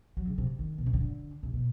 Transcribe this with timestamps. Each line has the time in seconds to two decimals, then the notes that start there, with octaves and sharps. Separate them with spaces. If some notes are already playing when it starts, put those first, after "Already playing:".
0.17 F#3
0.27 C#3
0.38 C3
0.59 D#3
0.78 B2
0.86 C3
0.93 C#3
1.01 D3
1.43 C3
1.53 B2